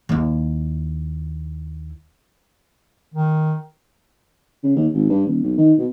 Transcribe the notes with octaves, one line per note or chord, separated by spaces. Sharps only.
D#2 E4
D#3
C#3
D#2
G#1
G2
D#1
B1
D#3
B2